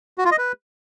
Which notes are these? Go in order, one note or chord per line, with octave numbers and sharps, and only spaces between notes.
F#4
F4
D#5
B4